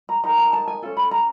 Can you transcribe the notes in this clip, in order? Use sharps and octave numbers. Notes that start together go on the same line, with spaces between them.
A#5
D#4 G4 A#4 A#5
A5
A5
G#5
C#4 F4 A4
B5
A#5